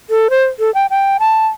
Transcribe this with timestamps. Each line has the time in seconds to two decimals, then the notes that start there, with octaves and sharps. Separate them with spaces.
0.10 A4
0.30 C5
0.59 A4
0.74 G5
0.90 G5
1.19 A5